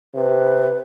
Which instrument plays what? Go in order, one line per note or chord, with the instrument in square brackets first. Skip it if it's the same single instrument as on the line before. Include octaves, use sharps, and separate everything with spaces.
[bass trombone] C3 [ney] B4